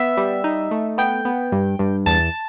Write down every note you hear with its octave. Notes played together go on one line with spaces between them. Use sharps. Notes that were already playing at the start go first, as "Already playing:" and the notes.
Already playing: B3 E5
G3
D#4
A3
B3 G5
B3
G2
G2
E2 A5